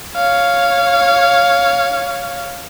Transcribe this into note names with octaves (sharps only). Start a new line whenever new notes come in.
C#5 F5